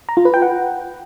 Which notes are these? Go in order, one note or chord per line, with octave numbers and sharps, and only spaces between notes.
A#5
F4
B4
G5
F#5